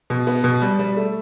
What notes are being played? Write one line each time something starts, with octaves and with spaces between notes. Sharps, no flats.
B2
B3
B2
G3
G3
A3